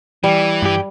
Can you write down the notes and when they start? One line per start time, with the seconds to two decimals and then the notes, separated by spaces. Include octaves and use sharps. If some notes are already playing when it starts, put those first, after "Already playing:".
0.24 E3 G3
0.62 G2 G4